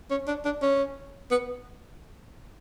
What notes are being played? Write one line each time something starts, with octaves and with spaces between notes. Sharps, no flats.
C#4
D4
D4
C#4
B3